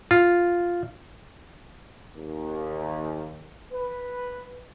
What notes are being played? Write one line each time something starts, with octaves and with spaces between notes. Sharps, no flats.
F4
D#2
B4